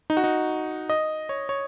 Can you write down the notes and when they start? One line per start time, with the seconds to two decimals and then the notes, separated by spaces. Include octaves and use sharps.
0.10 D#4
0.17 F#4
0.24 D#4
0.90 D#5
1.29 C#5
1.49 C#5